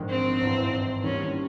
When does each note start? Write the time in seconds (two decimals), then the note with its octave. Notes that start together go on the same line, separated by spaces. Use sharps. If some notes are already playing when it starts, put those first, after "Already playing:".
Already playing: A#1 G#2 D#3 G#3
0.09 C4
0.41 G#1 G2 E3
1.03 D#2 D#3 G3 C#4